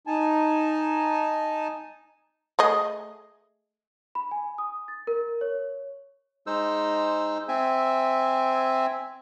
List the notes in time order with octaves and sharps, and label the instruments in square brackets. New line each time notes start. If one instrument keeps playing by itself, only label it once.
[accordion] D#4 G#5 A5
[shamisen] A3 G#4 D#5
[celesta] B5
G#5
D#6
A6
A#4
C#5
[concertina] G#3 D#4 C5 E6
C4 E5 G#5